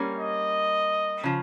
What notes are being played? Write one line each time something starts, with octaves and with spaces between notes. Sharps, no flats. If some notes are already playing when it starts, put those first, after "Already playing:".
Already playing: G3 A#3 C#4
D#5
C#3 F3